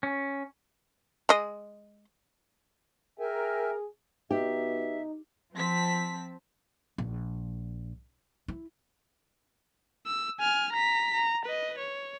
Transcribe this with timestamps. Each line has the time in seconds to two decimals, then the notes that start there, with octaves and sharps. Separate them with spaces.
0.03 C#4
1.29 G#3 D#5
3.19 G#4 A#4 E5 G5 G#5
4.31 B2 D#4 G4 E5
5.54 F3 C4 A5 B6
6.98 A#1
8.48 E4
10.06 E6
10.40 G#5 F6
10.73 A#5 B6
11.14 A#5
11.45 B4 D#5
11.79 C#5